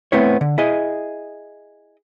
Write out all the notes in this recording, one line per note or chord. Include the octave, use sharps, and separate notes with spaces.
A3 B3 C4 E4 C#5
D3
E4 G#4 D#5